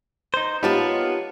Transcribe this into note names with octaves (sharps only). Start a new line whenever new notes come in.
D#4 C5
A#3 B3 D#4 F4 G4 C#5 A5